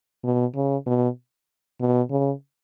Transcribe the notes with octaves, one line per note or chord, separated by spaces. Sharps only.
B2
C#3
B2
B2
C#3